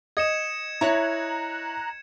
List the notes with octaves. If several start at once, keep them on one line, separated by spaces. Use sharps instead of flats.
D#5 G#6 C#7 E7
E4 C#5 E5 A#5 F#6